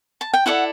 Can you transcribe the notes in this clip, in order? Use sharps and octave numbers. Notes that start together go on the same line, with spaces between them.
A5
G5
E4 A4 D5 F#5